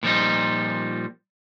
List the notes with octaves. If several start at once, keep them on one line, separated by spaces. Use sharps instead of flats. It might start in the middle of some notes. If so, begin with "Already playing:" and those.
A#2 F3 G3 D#4